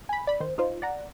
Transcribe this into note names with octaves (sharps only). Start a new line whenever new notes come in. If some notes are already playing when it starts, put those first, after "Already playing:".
G#5 B5
D5 B5
D#3 C5
D#4 F4 C5
D5 F#5 A#5